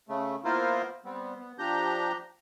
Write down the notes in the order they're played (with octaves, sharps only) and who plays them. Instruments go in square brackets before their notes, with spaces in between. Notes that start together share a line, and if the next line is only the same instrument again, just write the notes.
[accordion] C#3 A3
A#3 B3 E4 F4 A#4 C5
G3 B3 C4
B3
F3 D4 G4 A#5 G6